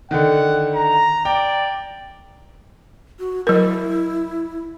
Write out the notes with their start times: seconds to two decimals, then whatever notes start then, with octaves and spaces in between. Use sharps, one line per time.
0.11 D3 D#3 F#5
0.74 A#5
1.25 D5 G5
3.19 F#4
3.47 F#3 E4 A#4